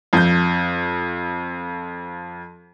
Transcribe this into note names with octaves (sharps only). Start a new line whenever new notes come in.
F2 G6